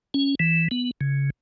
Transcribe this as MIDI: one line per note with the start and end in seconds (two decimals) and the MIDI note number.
0.14 0.35 61
0.40 0.68 52
0.71 0.91 59
1.01 1.30 49